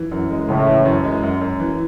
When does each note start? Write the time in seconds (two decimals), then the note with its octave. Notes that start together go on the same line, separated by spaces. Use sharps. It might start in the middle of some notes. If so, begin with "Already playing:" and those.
Already playing: E3
0.11 F#2
0.31 G#3
0.49 A2 C#3
0.67 E3
0.85 F#2
1.04 G#3
1.23 F#2
1.41 F#2
1.60 E3